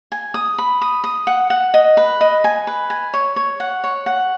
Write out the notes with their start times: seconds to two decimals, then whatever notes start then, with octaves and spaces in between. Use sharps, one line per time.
0.12 G#5
0.34 D#6
0.58 B5
0.81 D#6
1.04 D#6
1.27 F#5
1.50 F#5
1.74 D#5
1.97 B4
2.21 D#5
2.44 G#5
2.67 B4
2.90 G#5
3.14 C#5
3.36 C#5
3.60 F#5
3.84 C#5
4.06 F#5